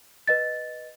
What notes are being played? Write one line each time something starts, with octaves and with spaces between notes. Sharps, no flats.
B4 D#5 A6